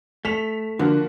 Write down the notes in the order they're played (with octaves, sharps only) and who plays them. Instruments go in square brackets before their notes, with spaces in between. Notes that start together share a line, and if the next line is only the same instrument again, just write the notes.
[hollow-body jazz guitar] A3 [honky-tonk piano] B6 E7 F7
[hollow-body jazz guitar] D3 [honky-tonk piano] F3 A#3 F#4